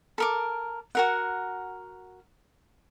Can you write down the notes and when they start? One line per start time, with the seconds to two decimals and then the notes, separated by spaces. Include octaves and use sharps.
0.18 A4 A#4 D6
0.95 F#4 A#4 F#5